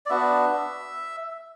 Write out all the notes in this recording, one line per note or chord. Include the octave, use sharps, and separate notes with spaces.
D5
B3 D4 F#4 E5